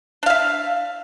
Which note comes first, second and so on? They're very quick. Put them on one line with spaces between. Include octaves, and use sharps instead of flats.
D4 F5 E5